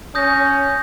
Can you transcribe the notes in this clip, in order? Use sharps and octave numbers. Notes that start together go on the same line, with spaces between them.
C#4 D#6 G6 A#6